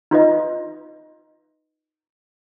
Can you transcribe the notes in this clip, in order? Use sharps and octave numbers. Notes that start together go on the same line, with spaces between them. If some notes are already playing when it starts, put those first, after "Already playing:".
D#4 F4 B4 D#5